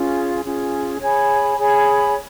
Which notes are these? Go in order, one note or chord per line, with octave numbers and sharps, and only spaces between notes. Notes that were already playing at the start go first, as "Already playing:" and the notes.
Already playing: C#4 F4 G#4
C#4 F4 G#4
G#4 C#5 G#5 B5
G#4 C#5 G#5 B5